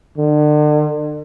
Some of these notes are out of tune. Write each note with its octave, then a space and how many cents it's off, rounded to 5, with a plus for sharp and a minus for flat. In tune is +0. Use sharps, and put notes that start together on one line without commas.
D3 +40